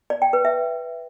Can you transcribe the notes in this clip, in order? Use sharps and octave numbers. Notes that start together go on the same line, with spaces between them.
D5
G5
B4
E5